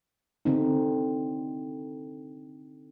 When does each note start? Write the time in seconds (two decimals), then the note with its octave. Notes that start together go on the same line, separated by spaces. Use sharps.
0.45 D3 C4 D#4